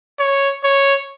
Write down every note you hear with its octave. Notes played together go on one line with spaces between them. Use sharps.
C#5
C#5